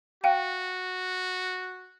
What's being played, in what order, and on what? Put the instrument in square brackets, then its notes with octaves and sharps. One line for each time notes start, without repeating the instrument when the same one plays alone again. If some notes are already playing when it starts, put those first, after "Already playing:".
[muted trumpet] F#4 [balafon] F5 G5